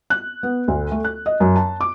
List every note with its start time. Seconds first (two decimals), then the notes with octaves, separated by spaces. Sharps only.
0.10 F#6
0.43 B3
0.68 D2
0.91 A3
1.04 F#6
1.26 D#5
1.40 F#2
1.56 A5
1.81 D6